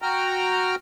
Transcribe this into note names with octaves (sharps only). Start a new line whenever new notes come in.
F#4 G5 A#5 F6